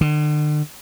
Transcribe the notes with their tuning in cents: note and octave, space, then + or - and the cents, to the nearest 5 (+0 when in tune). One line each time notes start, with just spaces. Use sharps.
D3 +40